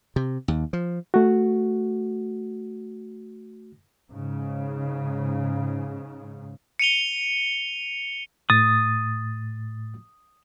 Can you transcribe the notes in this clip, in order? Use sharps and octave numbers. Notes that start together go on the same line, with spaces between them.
C3
D#2
F3
A3 F#4
G#2 C#3
C#7 D#7 F7 G7
A2 D#6 A6